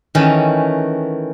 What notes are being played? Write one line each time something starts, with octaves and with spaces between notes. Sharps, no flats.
D#3 E3 A3 C#4